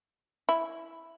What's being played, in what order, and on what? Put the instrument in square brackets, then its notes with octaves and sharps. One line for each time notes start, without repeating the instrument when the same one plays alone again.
[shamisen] E4